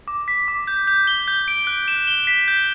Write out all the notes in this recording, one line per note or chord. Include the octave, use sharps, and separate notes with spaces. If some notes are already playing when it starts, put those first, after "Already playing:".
D6
B6
D6
G6
G6
G7
G6
D7
F#6
E7
G7
B6
G6